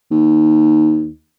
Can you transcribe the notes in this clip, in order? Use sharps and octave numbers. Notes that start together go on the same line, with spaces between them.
D#2